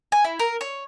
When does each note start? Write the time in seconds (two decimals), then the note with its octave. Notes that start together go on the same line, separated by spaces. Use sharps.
0.12 G#5
0.24 E4
0.39 A#4
0.61 C#5